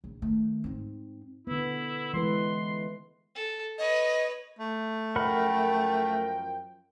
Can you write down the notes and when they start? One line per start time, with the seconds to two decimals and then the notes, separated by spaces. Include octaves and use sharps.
0.04 A#1
0.22 D#3 A3
0.64 G#2 C4
1.47 D3 B3 E4
2.14 E3 G#3 B4 C6
3.35 A4
3.78 B4 C#5 D#5
4.59 A3
5.16 F#2 F3 A#4 F#5 G5 B5